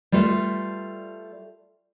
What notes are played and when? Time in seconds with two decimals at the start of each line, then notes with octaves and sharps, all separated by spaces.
0.12 G3 A3 F4 A4 B4 E5